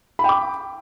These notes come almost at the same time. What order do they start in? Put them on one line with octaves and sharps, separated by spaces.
B5 G5 D6